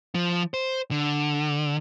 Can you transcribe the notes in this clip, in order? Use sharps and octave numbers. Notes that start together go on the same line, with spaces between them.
F3
C5
D3